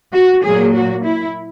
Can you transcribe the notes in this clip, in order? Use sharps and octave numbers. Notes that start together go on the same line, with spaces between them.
F#4
A#2 F#3 A#3 G#4
F#4
E4